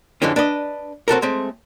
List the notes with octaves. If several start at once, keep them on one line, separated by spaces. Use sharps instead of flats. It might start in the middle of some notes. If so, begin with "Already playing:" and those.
F2 D3 E3 G#3 C#4
D4 B4 D#5
C4 F#4 A4 A#4
G#3 A3 C4